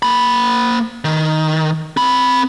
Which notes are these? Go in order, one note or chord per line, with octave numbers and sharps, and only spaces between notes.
A#3 B5
D#3
C4 B5